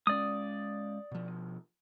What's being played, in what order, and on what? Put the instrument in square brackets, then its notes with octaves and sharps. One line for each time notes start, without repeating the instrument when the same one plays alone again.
[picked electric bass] G#3 C#4 [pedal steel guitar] D5 D#6
[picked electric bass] B2 F3